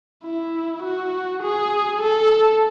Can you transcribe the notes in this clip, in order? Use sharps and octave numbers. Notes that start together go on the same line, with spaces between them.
E4
F#4
G#4
A4